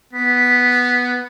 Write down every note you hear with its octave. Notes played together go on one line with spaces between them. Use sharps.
B3 B6